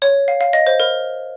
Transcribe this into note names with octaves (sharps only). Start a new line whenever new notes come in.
C#5
F5
F5
D#5
C5
A#4